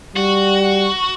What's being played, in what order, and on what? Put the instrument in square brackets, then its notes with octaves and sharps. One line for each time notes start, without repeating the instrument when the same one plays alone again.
[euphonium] G3 [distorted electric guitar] F#4